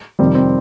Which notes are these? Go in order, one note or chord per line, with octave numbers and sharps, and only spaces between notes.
F2 C3 D#3 G3 C4
C4